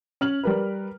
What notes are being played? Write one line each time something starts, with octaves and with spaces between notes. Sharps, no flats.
C#4 F6 F#7
G3 A#4 B4